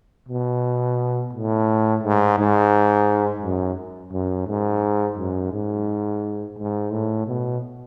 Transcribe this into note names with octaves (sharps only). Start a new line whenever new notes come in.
B2
A2
G#2
G#2
F#2
F#2
G#2
F#2
G#2
G#2
A2
B2